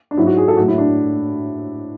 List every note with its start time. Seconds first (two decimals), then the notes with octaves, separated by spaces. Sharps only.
0.11 D4
0.17 G#2 F#3 E4
0.27 F#4
0.37 G#4
0.48 A4
0.57 A2 F#3 F#4
0.68 E4
0.78 D4